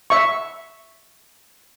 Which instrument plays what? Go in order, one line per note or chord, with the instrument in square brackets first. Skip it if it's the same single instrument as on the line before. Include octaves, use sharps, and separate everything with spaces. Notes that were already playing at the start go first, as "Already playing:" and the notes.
[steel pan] E5 C#6